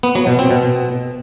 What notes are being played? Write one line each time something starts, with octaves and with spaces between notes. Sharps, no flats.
B3
F#3
B2
C4
B2